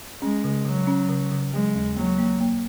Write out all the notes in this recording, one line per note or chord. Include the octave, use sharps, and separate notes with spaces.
G#3 C#4
C#3
C#3 F#3
C#4
C#3
C#3
F#3 G#3
D#2
F#3 A#3
A#3
A#3